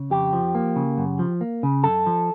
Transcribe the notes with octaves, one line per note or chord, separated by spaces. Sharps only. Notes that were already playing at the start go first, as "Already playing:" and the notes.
Already playing: C#3
F2 G4
F3
A#3
C#3
F#2
F3
A#3
C#3
F#2 A4
F3